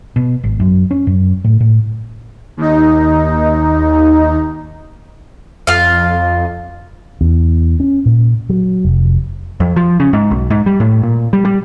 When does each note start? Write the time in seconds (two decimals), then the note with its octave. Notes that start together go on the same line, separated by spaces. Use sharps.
0.16 B2
0.44 G#1
0.60 F#2
0.91 C#4
1.07 F#2
1.44 A2
1.60 A2
2.57 D#2 D#4
5.67 F2 F4 F5
7.21 E2
7.80 C#4
8.06 A#2
8.50 F#3
8.85 F1
9.60 F2
9.76 F3
10.00 C#3
10.13 G#2
10.31 B1
10.50 G#2
10.66 G3
10.80 A2
11.03 A#2
11.33 G3
11.45 G3